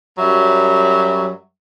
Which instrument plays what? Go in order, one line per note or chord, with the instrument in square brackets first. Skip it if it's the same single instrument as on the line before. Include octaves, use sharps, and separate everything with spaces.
[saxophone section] F#2 F#3 G3 E5